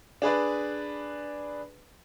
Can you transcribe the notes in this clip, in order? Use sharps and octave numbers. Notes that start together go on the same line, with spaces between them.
D4 G#4 B4 D5